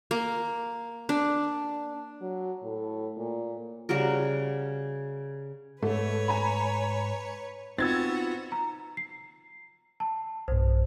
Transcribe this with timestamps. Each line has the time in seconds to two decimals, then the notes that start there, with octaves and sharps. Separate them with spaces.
0.11 A#3
1.09 D4
2.21 F#3
2.63 A2
3.16 A#2
3.89 C#3 G3 F#4 A#4
5.83 G#2 A3 B4 C#5
6.28 G#5 A#5 B5
7.78 B3 C4 D#4 F4 F#4 E6 G#6 A6
8.52 A#5
8.97 C7
10.00 A5
10.48 B1 G2 C5